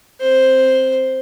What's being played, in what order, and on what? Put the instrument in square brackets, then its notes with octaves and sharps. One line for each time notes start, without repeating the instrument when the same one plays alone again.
[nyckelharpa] C4 C5